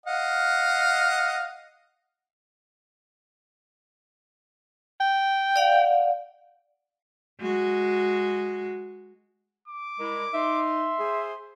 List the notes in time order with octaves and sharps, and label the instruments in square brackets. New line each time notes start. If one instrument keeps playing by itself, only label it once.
[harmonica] D#5 F5 F#5
[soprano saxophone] G5
[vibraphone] D5 F5 F#5
[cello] G#3 F#4
[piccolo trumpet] D6
[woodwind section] G3 G#3 E4 [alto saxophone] A#4
[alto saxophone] D#4 [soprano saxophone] E5 [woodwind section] C6
[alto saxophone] G#4 [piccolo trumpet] C5